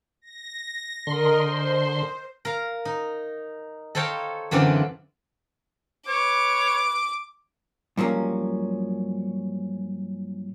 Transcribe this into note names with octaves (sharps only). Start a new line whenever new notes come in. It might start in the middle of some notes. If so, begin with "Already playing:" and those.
A#6
D3 A#4 D#5 C6
C5
A#4 F5
D#4
A4 C5 C#5 F5 G5 A#5
F#2 D3 E3 C4 D4 F4
B4 C#5 D6
G2 F3 F#3 A#3 C#4